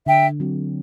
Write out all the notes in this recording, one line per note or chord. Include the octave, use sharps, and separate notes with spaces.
D3 E5 G5
F#3 C4 F#4